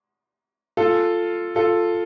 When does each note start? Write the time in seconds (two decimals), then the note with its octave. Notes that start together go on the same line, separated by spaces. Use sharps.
0.77 F4 A4
1.56 F4 A4